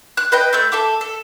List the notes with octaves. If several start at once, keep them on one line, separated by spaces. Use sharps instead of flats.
F#6
B4 D#5 G5
A3 E6 G6
A4 E5 D6
A4